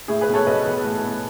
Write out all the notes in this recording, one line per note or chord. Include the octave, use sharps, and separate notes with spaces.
A2 E4 G#4
G#4 B4
B1
A4 C#5
B1 B4 D#5
E3
A2
B1